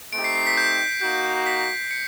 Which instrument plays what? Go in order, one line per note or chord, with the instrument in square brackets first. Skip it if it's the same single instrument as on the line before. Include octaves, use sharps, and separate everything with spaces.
[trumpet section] A3 C4 D#4 G4 [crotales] D7
[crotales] C7
C7
B6
G6
[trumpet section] A#3 D#4 F#4 [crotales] G6
[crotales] B6
C#7